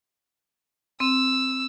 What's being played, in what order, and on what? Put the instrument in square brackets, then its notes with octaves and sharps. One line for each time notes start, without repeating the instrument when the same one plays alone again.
[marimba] C4 [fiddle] E6